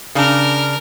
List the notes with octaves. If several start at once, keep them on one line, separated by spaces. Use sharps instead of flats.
C#3 D4 A#4 F6